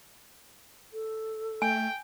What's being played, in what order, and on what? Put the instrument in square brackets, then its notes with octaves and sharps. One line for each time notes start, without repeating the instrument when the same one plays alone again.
[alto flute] A4
[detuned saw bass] A3 [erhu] G5 [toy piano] G#5